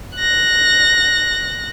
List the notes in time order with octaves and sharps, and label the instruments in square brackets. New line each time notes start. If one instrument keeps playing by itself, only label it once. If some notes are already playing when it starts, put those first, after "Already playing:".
[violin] F#6 A#6